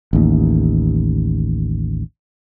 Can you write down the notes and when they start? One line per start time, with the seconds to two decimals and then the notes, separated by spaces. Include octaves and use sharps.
0.13 A1 D#2